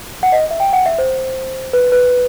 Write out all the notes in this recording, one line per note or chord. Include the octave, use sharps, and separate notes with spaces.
F#5
D#5
E5
G5
F#5
E5
C5
B4
B4